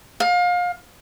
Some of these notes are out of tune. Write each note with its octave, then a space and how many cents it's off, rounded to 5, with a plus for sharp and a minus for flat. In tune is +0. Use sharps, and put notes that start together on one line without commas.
F5 +30